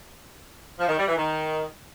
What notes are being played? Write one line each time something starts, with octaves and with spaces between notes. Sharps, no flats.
F3
D#3
G3
E3
D#3